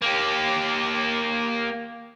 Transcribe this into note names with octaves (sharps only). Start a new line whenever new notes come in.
A#3 G4